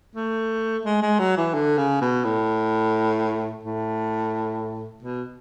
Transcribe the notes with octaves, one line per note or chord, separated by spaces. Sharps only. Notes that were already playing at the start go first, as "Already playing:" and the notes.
A3
G#3
G#3
F#3
E3
D3
C#3
B2
A2
A2
B2